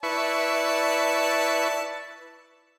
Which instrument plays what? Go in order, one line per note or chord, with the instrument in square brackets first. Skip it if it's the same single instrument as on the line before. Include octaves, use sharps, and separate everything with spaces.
[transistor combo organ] E4 B4 C#6 [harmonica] D5 A5